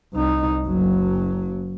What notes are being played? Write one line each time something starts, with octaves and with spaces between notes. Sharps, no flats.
C2 D#4
F#1 F#3